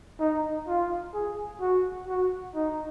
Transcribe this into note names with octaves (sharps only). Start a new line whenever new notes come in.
D#4
F4
G#4
F#4
F#4
D#4